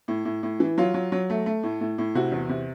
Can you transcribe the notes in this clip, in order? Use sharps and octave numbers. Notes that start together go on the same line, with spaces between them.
A2
A2
A2
E3
F#3 F4
F#3
F#3
A3
A3
A2
A2
A2
C3 F#4
E2
C3